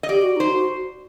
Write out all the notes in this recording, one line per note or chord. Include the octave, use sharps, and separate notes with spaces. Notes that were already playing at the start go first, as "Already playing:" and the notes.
D#5
G4 D5
F#4
D#4 C5
F#4